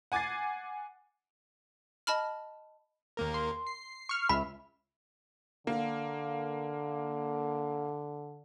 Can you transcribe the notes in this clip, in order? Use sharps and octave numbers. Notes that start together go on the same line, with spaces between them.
F#5 G#5 D6 G#6 A6 C7
D#5 A5 B5 F6
D#2 A#3 A#4
C6
C7
C#6 F6
C#2 E5 B5
D3 A#3